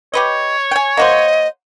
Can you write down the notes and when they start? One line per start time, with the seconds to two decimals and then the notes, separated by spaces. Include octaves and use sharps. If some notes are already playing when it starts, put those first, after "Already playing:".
0.14 G4 B4 C#5 D#5
0.71 G5 G#5
0.97 A#3 F#4 C5 D#5